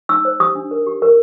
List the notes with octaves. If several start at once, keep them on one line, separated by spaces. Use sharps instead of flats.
D#4 E6
C5
G4 D#6
D4
A#4
G4
A#4